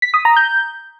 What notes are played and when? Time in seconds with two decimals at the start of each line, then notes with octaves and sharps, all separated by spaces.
0.02 B6
0.14 D#6
0.25 A#5
0.37 G6